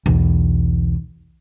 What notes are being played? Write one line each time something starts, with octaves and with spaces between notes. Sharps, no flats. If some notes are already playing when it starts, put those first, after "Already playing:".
B1 E2